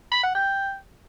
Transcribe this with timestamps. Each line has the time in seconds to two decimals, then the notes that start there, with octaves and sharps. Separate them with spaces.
0.12 B5
0.23 F#5
0.35 G5